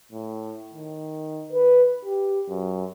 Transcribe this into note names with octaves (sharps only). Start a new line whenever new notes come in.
A2
D#3
B4
G4
F#2